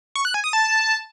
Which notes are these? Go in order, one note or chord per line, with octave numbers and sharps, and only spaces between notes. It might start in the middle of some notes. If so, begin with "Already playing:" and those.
C#6
F#6
G#5
D#6
A5